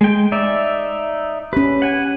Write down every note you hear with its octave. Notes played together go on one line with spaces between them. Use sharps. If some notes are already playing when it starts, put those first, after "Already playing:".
G#3 G5
D#4 D5 E5
C#4 G4 B4
F#5 G#5